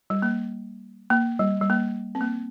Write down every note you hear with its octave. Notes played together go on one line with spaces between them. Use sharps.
G3
A#3
A#3
G3
G3
A#3
C4
A#3